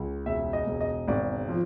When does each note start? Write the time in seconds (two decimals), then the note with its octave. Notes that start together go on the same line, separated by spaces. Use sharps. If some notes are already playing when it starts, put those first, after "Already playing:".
Already playing: C#2
0.26 E1 E5
0.53 D#5
0.66 E1
0.81 D#5
1.08 G#1 D5
1.49 F3